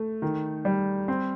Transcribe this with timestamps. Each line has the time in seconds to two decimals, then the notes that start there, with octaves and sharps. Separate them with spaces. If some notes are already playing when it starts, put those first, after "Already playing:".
Already playing: A3
0.22 D#3
0.65 G3
1.08 C4